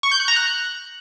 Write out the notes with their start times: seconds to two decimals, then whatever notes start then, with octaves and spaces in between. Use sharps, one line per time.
0.03 C#6
0.12 G6
0.20 F#6
0.28 A#5
0.36 F#6